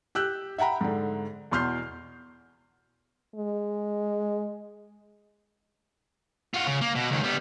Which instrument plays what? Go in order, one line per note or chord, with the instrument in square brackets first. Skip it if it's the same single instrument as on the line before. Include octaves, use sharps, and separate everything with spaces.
[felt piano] G4 E6 F#6 G6
E5 F#5 G5 A#5 B5
G#2 D3
E2 B2 C6 F6 G6 C7
[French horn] G#3
[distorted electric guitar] F4 F#4
C#3
A#3
B2
C#2 D#3
G3 B3